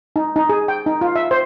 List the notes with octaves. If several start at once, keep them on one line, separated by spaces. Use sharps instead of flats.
D#4
D#4
G#4
G5
D#4
F4
E5
C5